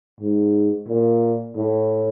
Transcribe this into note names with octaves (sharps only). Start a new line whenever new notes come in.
G#2
A#2
A2